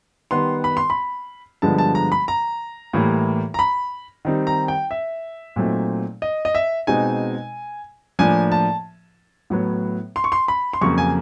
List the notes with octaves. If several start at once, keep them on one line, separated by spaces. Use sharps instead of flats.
D#3 G3 B3 C6
B5
C6
B5
G2 D3 F3 G#3 B3 A5
A5
A#5
B5
A#5
A2 E3 G3 A#3
A#5
B5
D#3 G3 C4 D#4
A#5
G5
E5
A#2 F#3 A3 C4 D#4
D#5
D#5
E5
B2 G#3 C4 D#4 G#5
A2 F3 A#3 D4 G#5
A5
A2 F#3 B3
C6
C#6
C6
B5
C6
F2 C#3 F#3 A#3 C#6
G#5